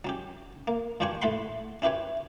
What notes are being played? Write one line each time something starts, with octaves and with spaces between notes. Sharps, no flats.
F#3 C#4 G4
A#3
G2 F3 D4 G4 G#5 C#6
A2 A3 A4 F#5 B5 C6
C#4 E4 G4 B4 C#5